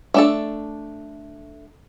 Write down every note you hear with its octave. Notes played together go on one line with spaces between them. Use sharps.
A3 D4 A4